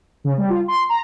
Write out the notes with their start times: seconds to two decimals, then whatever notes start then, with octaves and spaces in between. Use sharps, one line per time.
0.24 C#3
0.38 G3
0.50 F4
0.68 C6
0.89 A#5